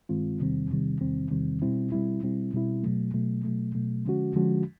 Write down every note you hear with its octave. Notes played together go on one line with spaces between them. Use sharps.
G2 D#3 G#3 C4 F4
E2 C3 D#3 G3 C4
E2 C3 D#3 G3 C4
E2 C3 D#3 G3 C4
E2 C3 D#3 G3 C4
B2 G3 C4 E4
B2 G3 C4 E4
B2 G3 C4 E4
B2 G3 C4 E4
B2 F#3 A3
B2 F#3 A3
B2 F#3 A3
B2 F#3 A3
D3 F3 G#3 C#4 F#4
D3 F3 G#3 C#4 F#4